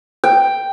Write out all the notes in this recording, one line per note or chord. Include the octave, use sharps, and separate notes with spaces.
G5